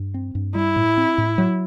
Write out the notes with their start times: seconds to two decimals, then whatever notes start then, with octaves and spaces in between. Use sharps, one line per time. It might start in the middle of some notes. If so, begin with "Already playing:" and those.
Already playing: G2
0.14 C4
0.35 G2
0.55 G3 E4
0.76 A2
0.97 C4
1.18 A2
1.38 F#3